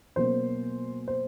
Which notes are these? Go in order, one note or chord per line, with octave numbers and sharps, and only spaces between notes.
B2 F#3 A#3 C#4 C5
C5